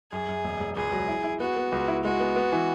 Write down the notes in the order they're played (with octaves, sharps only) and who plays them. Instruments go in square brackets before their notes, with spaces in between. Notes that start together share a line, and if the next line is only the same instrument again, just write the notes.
[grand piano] F#2 [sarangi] G#4
[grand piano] F#2
E1
E1
[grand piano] C#2 [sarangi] G#4
[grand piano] F#3
E4
E4
[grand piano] B3 [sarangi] F#4
[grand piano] B3
C#2
E4
[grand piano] G#3 [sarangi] F#4
[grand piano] B3
B3
E3